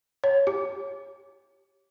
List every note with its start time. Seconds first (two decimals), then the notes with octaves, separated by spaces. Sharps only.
0.24 C#5
0.47 G4